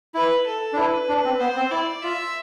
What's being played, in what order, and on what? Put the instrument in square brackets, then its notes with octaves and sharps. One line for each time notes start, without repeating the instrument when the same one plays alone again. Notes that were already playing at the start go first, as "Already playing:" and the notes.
[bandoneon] E4 [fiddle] B4
[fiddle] A4
[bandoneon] D4
[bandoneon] E4 [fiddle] B4
[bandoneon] D4
C4
[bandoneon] B3 [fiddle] C5
[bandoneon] C4
[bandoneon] E4 [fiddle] D5
[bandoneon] F4 [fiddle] E5